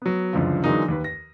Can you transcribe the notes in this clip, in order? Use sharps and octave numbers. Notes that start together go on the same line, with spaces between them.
F#3 B3
C#2 F#2 D3 E3 F3
D3 E3 F#3 G#3 A#3 D#4
D#2 B4
A#6